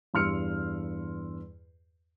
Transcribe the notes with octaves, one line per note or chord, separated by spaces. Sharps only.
E2 G2 C6 E6 F6 C#7